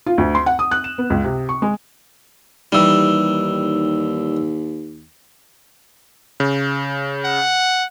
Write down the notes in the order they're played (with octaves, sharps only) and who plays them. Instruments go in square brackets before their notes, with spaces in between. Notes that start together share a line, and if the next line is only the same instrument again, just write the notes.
[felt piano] F4
D2
C6
F#5
D#6
F#6
E7
B3
C#2
C3
C#6
G#3
[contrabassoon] D#2 [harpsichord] E3 G3 [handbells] D#4 E6
[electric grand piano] C#3
[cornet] F#5